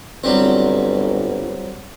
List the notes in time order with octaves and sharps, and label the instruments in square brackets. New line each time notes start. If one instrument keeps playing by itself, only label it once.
[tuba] G1 [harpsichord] F#3 G3 C4